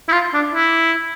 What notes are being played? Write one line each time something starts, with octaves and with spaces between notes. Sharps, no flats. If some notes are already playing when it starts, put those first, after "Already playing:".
E4
F4
D4
E4